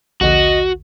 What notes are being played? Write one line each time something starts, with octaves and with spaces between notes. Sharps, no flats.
A#1 D#2 D3 F#4 D#5